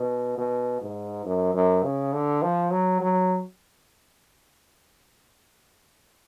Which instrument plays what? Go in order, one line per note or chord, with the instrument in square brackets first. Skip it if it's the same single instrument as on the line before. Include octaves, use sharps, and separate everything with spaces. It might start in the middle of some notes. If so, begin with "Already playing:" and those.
Already playing: [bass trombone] B2
B2
G#2
F#2
F#2
C#3
D3
F3
F#3
F#3